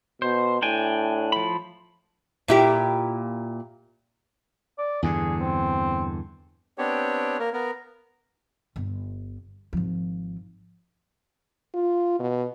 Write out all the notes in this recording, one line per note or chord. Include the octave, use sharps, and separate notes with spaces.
B2 C5
A2 D4 G5 G#5
F3 B5
A#2 E4 G4
D5
E2 G2 D3 G#4
C4
B3 C4 D4 G4 C#5
A#3 A#4
B3 A#4
G1
G#1 F3
F4
B2